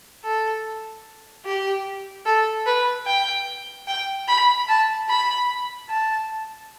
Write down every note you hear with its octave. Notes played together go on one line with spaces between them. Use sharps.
A4
G4
A4
B4
G5
G5
B5
A5
B5
A5